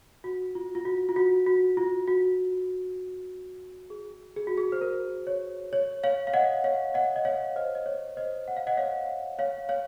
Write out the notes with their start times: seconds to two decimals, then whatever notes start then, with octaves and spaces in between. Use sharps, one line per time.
0.24 F#4
0.55 F4
0.75 F4
0.85 F#4
1.09 F4
1.16 F#4
1.46 F#4
1.77 F4
2.07 F#4
3.90 G#4
4.36 G#4
4.47 F#4
4.58 G#4
4.72 C5
4.81 A#4
5.27 C#5
5.73 C#5
6.04 C#5 F5
6.27 F5
6.34 D#5 F#5
6.64 C#5 F5
6.94 D#5 F#5
7.16 D#5
7.25 C#5 F5
7.56 C5 D#5
7.75 D#5
7.86 C#5
8.17 C5 D#5
8.48 F#5
8.57 F5
8.67 D#5 F#5
8.77 C#5 F5
9.39 C#5 F5
9.69 C#5 F5